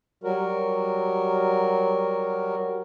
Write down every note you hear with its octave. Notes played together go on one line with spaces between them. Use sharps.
F#3 G3 F#4 A#4